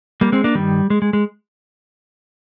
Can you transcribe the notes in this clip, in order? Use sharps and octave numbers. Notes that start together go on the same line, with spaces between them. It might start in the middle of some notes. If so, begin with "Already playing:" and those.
G3 A#3
G#3 C4
A#3 D4
G2 D#3 G3
G#3
G#3
G#3